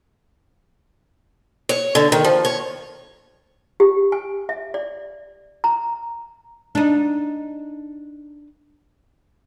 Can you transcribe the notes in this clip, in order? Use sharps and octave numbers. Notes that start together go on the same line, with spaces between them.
C#5
D3
D#3
F3
C#5
G4
G#5
E5
D5
A#5
D4 D#4